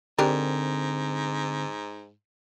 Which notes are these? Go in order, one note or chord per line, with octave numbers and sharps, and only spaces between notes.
G#2 D3 C4 D4 G4 A#4